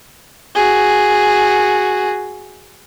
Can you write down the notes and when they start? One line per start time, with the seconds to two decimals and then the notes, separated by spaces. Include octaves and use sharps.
0.55 F#4 G#4